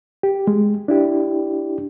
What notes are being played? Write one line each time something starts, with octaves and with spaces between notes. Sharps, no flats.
G4
G#3
D4 E4 G4